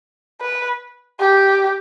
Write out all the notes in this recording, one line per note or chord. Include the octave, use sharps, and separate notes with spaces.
B4
G4